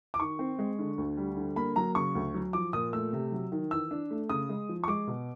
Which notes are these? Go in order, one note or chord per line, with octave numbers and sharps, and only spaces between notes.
D6
D#3 C#6
C4
G#3
D3
D2
G3
D3
A#3 B5
F#3 A#5
C#3 C#6
D2
F#3
F3 D6
A#2 D#6
A3 E6
C3
F#3
D#3
E3 E6
D4
A3
C#3 D#6
G#3
F3
C#6
G#3 D6
B2